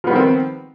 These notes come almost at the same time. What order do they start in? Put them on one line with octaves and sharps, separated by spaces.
F3 B3 G3 D#3 C4